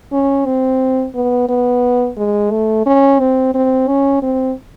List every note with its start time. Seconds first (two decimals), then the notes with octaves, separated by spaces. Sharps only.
0.12 C#4
0.45 C4
1.15 B3
1.48 B3
2.17 G#3
2.51 A3
2.86 C#4
3.19 C4
3.54 C4
3.87 C#4
4.22 C4